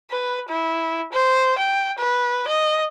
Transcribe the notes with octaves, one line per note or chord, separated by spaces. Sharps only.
B4
E4
C5
G5
B4
D#5